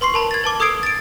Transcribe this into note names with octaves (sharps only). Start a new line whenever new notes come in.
B4 C6 C#6 C7
A#4 A5 B5
G#6 A6
B4 A5 D6
A4 D#6 E6 G#6 C7 D7
A6 D7